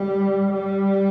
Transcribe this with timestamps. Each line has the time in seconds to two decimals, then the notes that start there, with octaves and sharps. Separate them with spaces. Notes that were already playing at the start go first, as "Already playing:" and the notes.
Already playing: G3
0.52 G3